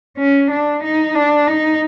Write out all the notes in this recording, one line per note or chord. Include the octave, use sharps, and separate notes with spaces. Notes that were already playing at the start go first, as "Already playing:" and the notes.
C#4
D4
D#4
D4
D#4